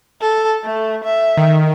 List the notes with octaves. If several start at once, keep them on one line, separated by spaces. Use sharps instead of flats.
A4
A3
E5
D#3